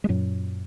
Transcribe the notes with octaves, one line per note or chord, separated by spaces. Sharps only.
G#3
F#2 A#2 F#3